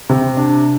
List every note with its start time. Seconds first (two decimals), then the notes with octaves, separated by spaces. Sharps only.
0.09 C3
0.37 D4